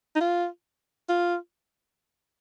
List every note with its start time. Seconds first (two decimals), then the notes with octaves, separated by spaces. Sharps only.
0.15 D#4
0.20 F4
1.09 F4